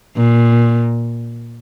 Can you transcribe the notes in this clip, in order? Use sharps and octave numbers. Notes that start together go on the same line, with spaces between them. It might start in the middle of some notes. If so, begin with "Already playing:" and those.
A#2